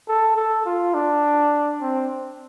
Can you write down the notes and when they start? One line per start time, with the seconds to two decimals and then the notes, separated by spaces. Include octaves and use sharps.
0.08 A4
0.36 A4
0.66 F4
0.94 D4
1.81 C4